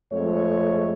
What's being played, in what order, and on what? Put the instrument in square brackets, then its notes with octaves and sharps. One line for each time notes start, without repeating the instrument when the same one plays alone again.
[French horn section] F2 G#3 A3 C#5